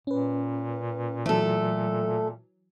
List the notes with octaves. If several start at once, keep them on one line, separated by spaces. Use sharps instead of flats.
A#2 C#4 B4
E3 F#3 A3 A4